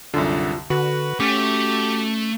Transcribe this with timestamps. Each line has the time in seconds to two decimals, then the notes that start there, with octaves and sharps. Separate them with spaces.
0.14 C2 F#2 D3 F4
0.70 D3 F#4 B4
1.20 A3 C#4 G4